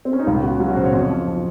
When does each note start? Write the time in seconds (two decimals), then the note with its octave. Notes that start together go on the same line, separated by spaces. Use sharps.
0.05 C4
0.13 C#4
0.19 D#4
0.27 C#2 F4
0.43 C#3 F#4
0.60 F#3 C#4
0.69 F#4
0.77 C#3 C5
0.85 C#5
0.93 F2
1.10 F3
1.27 F3